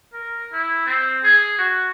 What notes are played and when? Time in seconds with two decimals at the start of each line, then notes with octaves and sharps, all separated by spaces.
0.13 A#4
0.52 E4
0.86 C4
1.23 G#4
1.58 F#4